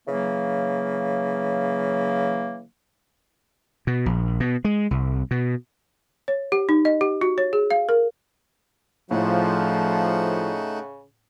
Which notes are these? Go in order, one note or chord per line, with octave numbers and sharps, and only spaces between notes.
C#3 E3 F#3 A#3
B2
A#1
B2
G#3
C2
B2
C#5
G4
D#4
D#5
G4
F#4
C#5
G#4
F5
A#4
A2 C#3 F3 A3 D#4 F#5